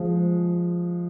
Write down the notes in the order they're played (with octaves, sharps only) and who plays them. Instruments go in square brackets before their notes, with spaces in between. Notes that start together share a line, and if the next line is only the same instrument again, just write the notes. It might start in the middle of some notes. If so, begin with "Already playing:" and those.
Already playing: [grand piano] F3 G#3